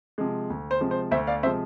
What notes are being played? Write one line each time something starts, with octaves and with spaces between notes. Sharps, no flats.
C3 F3 G#3
D2
C5
C3 F3 G#3
C5
D2 C5 E5
D5 F5
C3 F3 G#3 C5 E5